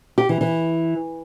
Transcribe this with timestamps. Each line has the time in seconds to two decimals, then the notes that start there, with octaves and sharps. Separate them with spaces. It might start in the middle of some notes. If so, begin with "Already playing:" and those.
0.18 G4
0.29 E3
0.41 E3